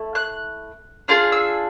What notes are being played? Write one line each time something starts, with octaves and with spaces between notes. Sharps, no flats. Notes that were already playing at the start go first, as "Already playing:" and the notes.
Already playing: A3 E4
F#6
D4 F4 G#4 F6
E6